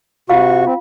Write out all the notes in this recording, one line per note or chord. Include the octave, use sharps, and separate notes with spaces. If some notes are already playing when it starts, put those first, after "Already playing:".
C3 F4 F#4 F5 C#6
C4 F4